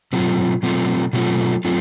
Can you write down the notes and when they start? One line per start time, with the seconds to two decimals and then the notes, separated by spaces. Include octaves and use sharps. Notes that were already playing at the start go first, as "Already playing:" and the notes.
0.13 B2 F#3 A3 C4 F4
0.63 B2 F#3 A3 C4 F4
1.13 B2 F#3 A3 C4 F4
1.65 F#3 A3 C4 F4